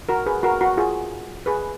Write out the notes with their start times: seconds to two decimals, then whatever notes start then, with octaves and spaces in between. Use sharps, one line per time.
0.09 F#4 A#4
0.26 G#4 B4
0.43 F#4 A#4
0.61 F#4
0.77 F4 G#4
1.46 G#4 B4